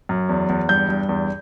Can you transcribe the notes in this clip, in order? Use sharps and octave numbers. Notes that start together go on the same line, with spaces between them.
F#2
E2
E2
G2 G6
G2
E2